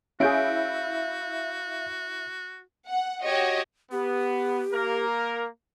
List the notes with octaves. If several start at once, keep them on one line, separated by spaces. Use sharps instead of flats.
C#4 E4 F#4 G#4 E5 F5 G6 D7
F#5
F#4 G4 C#5 D#5
B3 G4
A#3 A#4